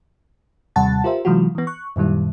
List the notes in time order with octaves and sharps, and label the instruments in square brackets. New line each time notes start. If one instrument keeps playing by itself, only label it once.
[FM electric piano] D#2 C3 G3 F#5 A5 A6
F4 G4 A#4 C5 E5
C3 E3 F#3 G#3 F4 F#4
E3 B3
C#6 F#6
F#2 A#2 D#3 G3 E4